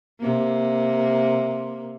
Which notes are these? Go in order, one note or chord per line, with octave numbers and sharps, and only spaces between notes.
C3 A#3